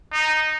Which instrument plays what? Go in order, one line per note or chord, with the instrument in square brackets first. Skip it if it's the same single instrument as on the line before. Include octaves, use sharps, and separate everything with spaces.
[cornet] D#4